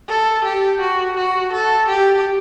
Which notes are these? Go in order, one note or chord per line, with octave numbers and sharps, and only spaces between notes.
A4
G4
F#4
F#4
A4
G4